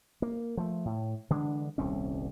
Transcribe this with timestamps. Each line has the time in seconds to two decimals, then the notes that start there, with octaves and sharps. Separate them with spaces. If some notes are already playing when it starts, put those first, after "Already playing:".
0.22 A#3
0.57 F3 A3
0.85 A2
1.30 D3 E3 G#3 D4
1.78 D#1 C2 C4 C#4